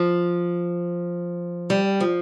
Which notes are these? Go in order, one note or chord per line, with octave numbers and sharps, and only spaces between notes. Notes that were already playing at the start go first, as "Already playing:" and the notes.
Already playing: F3
G3
F3